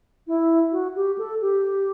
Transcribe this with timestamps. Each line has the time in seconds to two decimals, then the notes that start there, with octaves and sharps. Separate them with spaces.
0.27 E4
0.72 F#4
0.95 G4
1.18 A4
1.41 G4